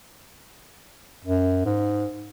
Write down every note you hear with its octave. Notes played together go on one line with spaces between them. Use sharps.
F#2
G#2